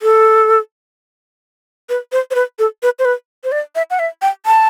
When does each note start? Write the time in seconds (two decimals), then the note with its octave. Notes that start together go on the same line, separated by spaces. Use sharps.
0.02 A4
1.89 B4
2.12 C5
2.31 C5
2.35 B4
2.59 A4
2.83 B4
2.99 C5
3.05 B4
3.44 C5
3.52 D5
3.75 E5
3.91 F#5
3.99 E5
4.22 G5
4.46 A5